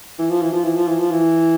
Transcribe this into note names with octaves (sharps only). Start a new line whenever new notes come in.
E3
F3
E3
F3
E3
F3
E3
F3
E3